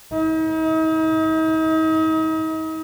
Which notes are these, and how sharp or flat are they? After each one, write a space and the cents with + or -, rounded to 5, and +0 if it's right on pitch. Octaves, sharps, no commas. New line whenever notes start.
D#4 +40